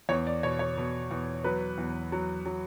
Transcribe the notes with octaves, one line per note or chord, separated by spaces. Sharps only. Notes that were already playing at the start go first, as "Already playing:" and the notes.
E2 C#5
D5
B2 C#5
C#5
B2
E2
F#3 B4
E2
F#3
F#3